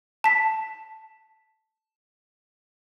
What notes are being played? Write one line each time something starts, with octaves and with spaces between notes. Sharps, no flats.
A5 B6